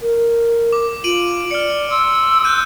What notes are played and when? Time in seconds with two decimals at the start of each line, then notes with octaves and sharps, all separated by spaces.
0.02 A#4
0.73 D6
1.04 F4 D7 D#7 F#7
1.51 D5 F6 C#7
1.90 C6 E6
2.44 F#6 G6 D#7